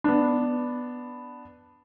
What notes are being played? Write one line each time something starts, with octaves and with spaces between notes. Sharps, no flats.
B3 D4